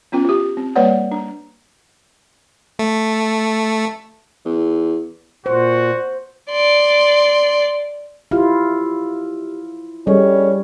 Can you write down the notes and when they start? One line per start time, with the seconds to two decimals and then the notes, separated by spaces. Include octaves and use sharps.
0.12 B3 C#4 F4 G5
0.25 F4 G4
0.57 C4
0.76 G3 A#3 B4 C#5 D5 F#5
1.12 D4
2.79 A3
4.45 E2
5.46 A#2 F#4 C5
6.51 D5 C6
8.31 E4 F4 G4 F6
10.07 G3 C#4 G#4 A4 D#5